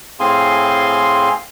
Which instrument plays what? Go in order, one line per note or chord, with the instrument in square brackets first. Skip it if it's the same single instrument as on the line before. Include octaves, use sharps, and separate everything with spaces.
[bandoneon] A2 C4 G#4 F5 G#5 C6